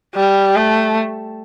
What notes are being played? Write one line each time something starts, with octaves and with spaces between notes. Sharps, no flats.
G3
A3